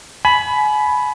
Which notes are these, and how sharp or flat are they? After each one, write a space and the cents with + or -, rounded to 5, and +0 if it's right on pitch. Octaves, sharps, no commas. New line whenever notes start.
G#5 +35 B5 +0